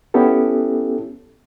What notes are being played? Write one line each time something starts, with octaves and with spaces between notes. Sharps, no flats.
B3 C#4 E4 G4 A4